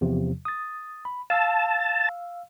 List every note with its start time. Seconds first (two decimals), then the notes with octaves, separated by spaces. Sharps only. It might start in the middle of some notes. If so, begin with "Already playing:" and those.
0.01 E2 C3 F3
0.45 D#6 A6
1.05 B5
1.30 F5 A5 E6